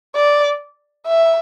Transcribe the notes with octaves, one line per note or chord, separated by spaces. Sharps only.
D5
E5